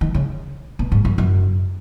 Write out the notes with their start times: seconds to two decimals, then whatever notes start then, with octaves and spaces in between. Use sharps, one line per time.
0.01 D#3
0.14 C#3
0.79 B2
0.92 G#2
1.05 F#2
1.18 F#2